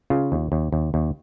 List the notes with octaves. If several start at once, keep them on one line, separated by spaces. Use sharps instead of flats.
C#3 F4
D#2
D#2
D#2
D#2